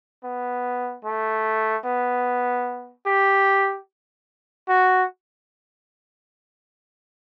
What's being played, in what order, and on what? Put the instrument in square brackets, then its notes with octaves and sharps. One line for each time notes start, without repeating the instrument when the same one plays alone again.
[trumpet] B3
A3
B3
G4
F#4